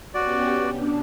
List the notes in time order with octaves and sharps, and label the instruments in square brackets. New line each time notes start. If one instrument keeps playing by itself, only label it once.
[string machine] B3 C#4 G4 [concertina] F#4 D5
[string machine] B2 D4